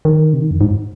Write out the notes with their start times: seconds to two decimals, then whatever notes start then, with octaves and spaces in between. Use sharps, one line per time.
0.05 D#3
0.34 C3
0.42 D#3
0.51 F2
0.61 G#2